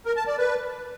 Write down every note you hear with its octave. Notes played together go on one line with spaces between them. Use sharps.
A#4
A5
D5
B4